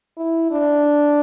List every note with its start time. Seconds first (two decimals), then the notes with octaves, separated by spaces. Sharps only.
0.17 E4
0.51 D4